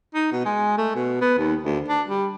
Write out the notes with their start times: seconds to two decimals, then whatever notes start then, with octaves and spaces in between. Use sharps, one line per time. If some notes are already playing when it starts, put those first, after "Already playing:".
0.15 D#4
0.32 B2
0.45 G#3
0.78 A3
0.95 B2
1.21 B3
1.38 D#2
1.64 D2
1.88 D4
2.08 G3